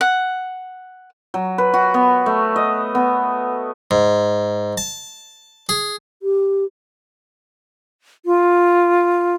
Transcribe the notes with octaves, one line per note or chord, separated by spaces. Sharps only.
F#5
F#3
B4
F#4
B3
A3
D#5
B3
G#2
A5
G#4
G4
F4